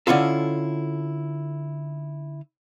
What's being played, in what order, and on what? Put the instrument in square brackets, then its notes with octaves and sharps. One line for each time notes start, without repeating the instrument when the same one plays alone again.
[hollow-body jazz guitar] D3 C#4 E4 F4 A4